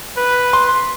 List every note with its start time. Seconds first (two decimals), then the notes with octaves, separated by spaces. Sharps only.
0.17 B4
0.53 C6